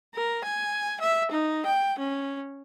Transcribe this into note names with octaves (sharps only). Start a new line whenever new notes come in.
A#4
G#5
E5
D#4
G5
C#4